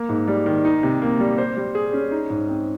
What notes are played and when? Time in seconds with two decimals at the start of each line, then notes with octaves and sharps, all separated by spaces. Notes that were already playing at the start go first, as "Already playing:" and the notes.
Already playing: A#3
0.09 G#2
0.28 G3
0.46 D#3
0.65 D#4
0.83 C3
1.02 A#3
1.20 G3
1.38 C5
1.57 G3
1.75 G#4
1.93 C#4
2.11 D#4
2.30 G#2
2.49 C4